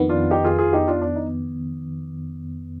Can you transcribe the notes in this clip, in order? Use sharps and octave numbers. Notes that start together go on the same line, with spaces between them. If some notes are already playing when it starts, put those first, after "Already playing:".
Already playing: F2 D#3 B3
D4 F4
D#4 G4
F4 G#4
F4 G#4
D#4 G4
D4 F4
D4
D#4